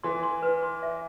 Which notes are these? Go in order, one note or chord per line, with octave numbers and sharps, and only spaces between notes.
E3 C6
C6
B4
C6
E5